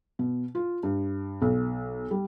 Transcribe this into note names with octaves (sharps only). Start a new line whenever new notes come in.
B2
F4
G2
B1
G3